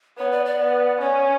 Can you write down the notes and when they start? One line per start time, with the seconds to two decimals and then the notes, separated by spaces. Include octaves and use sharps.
0.17 B3 C#5
0.31 D5
0.45 D5
0.60 B3
1.00 C#4 C#5